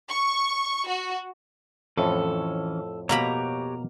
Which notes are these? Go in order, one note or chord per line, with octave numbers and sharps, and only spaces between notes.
C#6
F#4
F2 A2 E3 C#4 A4
B2 A#3 F#4 G4 C#5 A#5 B5